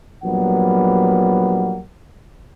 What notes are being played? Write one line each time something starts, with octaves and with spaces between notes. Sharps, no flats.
A#1 F#3 G3 A#3 B3 F#5